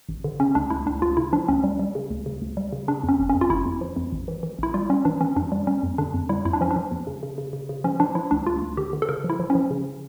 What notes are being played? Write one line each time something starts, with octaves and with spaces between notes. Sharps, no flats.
A1
D3
C#3 C#4
D2 D4
D2 E4
D2 D4
D2 F4
C#3 E4
F3 D4
D2 C#4
G3
G3
C#3
D2
C#3
D2
G3
C#3
C#3 D4
F2
C#4
G1
C#4
F2
F4
G1 E4
F2
F3
F2
A1
E3
E3
A1 E4
G3 F4
G3 C#4
E3 D4
E3 C#4
F2 D4
G3
G3 C#4
F2
D3 D4
F2
G3 E4
F2 E4
D4
F3 C#4
D4
F3
E2
C#3
C#3
C#3
C#3
C#3
F3 C#4
F3 D4
F3 E4
D2 D4
D2 F4
D2
D3 G4
D3
A4
C#3 A#4
F3
E4
F3
C#4
F3
C#3